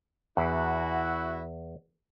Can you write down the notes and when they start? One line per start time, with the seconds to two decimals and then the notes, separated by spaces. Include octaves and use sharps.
0.37 E2 E4 F#4